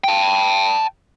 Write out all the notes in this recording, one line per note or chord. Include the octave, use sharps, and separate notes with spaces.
G5 A5